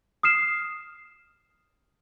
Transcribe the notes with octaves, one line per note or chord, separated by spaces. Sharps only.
D#6 F6 C7 E7